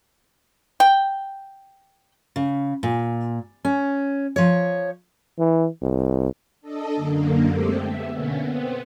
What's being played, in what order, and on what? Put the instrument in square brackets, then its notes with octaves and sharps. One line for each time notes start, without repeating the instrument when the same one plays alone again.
[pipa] G5
[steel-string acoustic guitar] C#3
A#2
C#4
F3 C#5
[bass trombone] E3
C2
[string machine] D4 A4 D#5
F#2 D3 A#3
G#3 A3 C4 G4 A4
B3 E5
B2 D3 A#3 B3 C#4
B3 C4